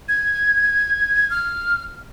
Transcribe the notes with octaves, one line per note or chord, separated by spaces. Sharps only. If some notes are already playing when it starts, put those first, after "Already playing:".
G#6
F6